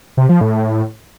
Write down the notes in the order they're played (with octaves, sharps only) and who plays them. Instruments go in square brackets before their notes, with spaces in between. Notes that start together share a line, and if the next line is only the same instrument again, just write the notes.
[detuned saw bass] C3
F3
A2